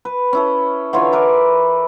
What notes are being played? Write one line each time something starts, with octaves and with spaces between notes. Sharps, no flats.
B4
C#4 E4 A4
D3 E3 F4 C#5
E4 A#4 B4 D5